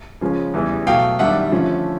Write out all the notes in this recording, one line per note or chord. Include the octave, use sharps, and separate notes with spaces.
C#3 F3 G#3 C#4
E2 C#3 E3 G3 B3
B2 F#3 A3 F5 G5
F#2 D#3 G3 B3 D4 E5 F#5
D3 F3 A3 C#4